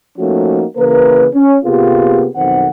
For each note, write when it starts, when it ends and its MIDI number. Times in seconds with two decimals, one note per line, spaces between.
0.18 0.65 53
0.18 0.65 57
0.18 0.65 58
0.18 0.65 61
0.18 0.65 63
0.18 0.65 66
0.77 1.26 49
0.77 1.26 52
0.77 1.26 58
0.77 1.26 70
0.77 1.26 71
1.34 1.58 61
1.65 2.28 48
1.65 2.28 58
1.65 2.28 59
1.65 2.28 65
1.65 2.28 67
1.65 2.28 68
2.36 2.67 35
2.36 2.67 41
2.36 2.67 51
2.36 2.67 60
2.36 2.67 78